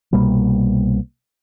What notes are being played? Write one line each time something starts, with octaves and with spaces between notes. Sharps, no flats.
C2 B2 G3 A#3